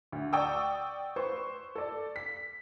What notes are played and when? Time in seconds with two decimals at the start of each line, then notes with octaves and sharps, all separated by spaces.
0.12 D2
0.33 D5 F#5 G5 C#6 D#6 E6
1.16 B4 C5 C#6
1.76 A4 D5
2.16 B6